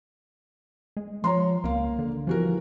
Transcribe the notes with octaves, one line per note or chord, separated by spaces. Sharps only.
G#3
F3 C#5 A#5 C6
C#2 A#3 F5
D3
E3 F3 F#4 A#4